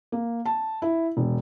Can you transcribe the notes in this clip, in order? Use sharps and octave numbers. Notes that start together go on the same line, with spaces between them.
A#3
A5
E4
E1